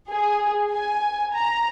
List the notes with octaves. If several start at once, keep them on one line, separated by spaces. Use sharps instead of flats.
G#4
G#5
A#5